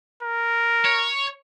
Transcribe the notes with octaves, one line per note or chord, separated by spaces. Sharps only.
A#4
C#5